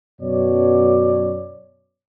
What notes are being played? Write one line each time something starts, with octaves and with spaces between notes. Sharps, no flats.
F#2 B2 C#5 D5